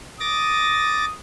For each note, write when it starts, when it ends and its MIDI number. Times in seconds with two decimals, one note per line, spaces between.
0.20 1.05 86
0.20 1.14 87
0.20 1.05 93
0.20 1.05 94